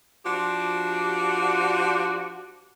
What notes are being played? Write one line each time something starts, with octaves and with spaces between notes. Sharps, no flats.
F3 D4 F#4 G4